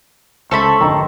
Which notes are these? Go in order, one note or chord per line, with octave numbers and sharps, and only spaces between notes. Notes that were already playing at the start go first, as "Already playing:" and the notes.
C#2 A4 C5 E5 B5 C#6
G#1 F2 D3 D#3 A#5 C6